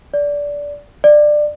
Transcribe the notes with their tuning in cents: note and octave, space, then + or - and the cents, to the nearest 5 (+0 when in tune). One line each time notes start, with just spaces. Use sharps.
D5 -15
D5 +20